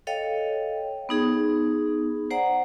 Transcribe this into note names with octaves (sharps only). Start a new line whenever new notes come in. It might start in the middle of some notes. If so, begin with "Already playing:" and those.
A4 C#5 D#5 F5 G5
B3 D#4 G#4
C5 D5 F#5 A#5